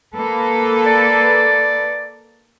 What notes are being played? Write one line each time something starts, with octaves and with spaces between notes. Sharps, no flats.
A#3 A4 B4
D5